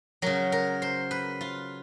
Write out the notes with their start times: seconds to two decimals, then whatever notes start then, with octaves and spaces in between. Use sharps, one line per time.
0.22 C#3 F#3 A#4
0.52 A#4
0.82 C5
1.11 B4
1.41 F4